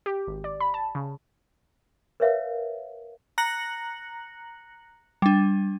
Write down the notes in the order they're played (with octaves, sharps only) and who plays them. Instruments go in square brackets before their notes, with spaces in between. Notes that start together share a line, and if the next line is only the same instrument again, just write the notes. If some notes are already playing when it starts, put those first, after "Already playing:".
[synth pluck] G4
G#1
D5
B5
A5
C#3
[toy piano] A#4 B4 C#5 E5 F5
[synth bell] A#5 F#6 A#6 C#7 F#7
G3 D4